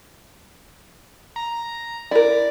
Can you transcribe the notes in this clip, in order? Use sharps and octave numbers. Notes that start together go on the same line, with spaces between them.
A#5
E4 A#4 D5